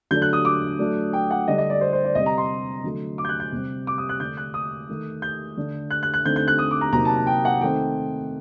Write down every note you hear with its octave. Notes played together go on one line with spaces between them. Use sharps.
D3 F#3 A3 D4 G6
F#6
D#6
D6
F#3 A3 D4
G5
F#5
D3 G3 D4 D#5
D#5
D5
C5
C5
D5
C3 G3 C4 D#5
A#5
C6
D3 F#3 A3
D6
G6
F#6
G6
C3 G3 C4
D6
D#6
F#6
D3 A3 D4 G6
F#6
D#6
D#3 A3 D#4
G6
D3 A3 D4
F#6
F#6
F#6
D3 A3 C4 D#4 G6
G6
F#6
D#6
D6
A#5
C3 F#3 A#3 D#4 A#5
A5
A5
G5
F#5
D#3 A3 C4 D#4 G5